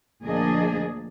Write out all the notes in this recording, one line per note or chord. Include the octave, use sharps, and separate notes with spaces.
D2 A#2 F3 D4 G#4 D#5